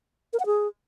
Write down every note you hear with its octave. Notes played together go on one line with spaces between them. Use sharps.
A#4
F#5
G#4